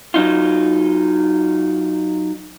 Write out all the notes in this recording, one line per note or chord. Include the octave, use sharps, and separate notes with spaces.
F#3 D#4 F4